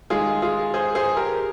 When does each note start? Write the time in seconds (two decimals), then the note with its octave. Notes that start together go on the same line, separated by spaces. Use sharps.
0.10 D#3 G#3 F4 G#4
0.42 F4 G#4
0.74 G#4 C5
0.95 G#4 C5
1.17 G4 A#4